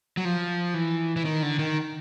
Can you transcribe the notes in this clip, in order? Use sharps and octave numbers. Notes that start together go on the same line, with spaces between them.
F#3
F3
E3
E3
D#3
D3
D#3